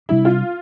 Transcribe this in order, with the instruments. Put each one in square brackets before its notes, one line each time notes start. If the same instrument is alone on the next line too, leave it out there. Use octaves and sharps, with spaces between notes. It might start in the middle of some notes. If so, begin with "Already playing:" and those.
[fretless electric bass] C3 G3 D4 [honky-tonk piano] E4
[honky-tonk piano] F4